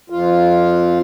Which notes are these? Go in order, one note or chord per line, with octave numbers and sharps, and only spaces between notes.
F2 F4